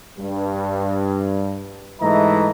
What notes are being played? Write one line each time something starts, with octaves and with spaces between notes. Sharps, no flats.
G2
G#2 E3 A3 D#5 A#5